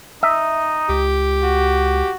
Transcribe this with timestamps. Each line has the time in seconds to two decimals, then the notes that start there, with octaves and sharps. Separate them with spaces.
0.23 D#4 E5
0.89 C#2 G4
1.43 F#4